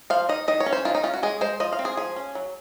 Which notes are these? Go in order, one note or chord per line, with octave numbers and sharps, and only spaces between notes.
F3 F5
D#4 D#5
D#3 D#5
C#5
C#4
C5
D#3 F4
D#4
C#4 F4
F#4
G#3 G#4
G#3 C5
F3 D#5
F5
C4
G#4
F3 G#4
C#4
F#3